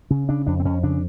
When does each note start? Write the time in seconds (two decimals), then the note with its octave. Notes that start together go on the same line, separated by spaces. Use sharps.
0.10 C#3 C#4
0.29 C#3 D4
0.47 F2 D4
0.60 C4
0.65 F2 C#4
0.83 C#3 D4